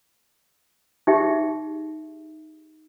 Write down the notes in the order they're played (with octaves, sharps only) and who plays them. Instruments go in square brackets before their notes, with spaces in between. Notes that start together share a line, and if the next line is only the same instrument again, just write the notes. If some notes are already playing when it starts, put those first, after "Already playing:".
[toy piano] D#4 G4 G#4 E5 G5